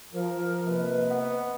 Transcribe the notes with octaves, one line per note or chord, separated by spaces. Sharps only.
F3 A#4
C3 A#3 B4 D#5
B3